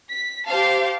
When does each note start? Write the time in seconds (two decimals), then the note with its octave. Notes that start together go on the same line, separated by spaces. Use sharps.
0.11 B6
0.48 G4 C5 F5 A5